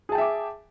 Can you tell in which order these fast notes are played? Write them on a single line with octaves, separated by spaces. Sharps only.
G#4 A5 G5 E5 D6